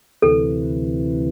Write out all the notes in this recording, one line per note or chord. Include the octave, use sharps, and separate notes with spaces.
D2 C3 E3 A4